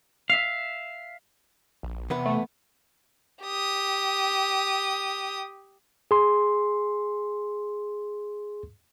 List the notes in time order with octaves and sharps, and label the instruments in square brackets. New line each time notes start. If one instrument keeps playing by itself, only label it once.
[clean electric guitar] E5 F5
[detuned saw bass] A#1
[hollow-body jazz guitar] E2 B3 B4 [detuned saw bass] C3
[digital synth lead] A3
[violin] G4 D#6
[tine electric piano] G#4 C6